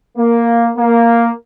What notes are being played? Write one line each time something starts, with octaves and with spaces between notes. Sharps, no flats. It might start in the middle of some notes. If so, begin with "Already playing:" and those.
A#3
A#3